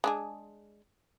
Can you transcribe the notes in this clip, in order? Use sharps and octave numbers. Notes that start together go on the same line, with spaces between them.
G#3 D4 G#4